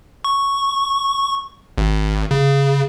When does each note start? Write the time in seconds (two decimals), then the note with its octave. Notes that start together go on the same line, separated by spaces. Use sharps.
0.24 C#6
1.78 G#1
2.31 C#3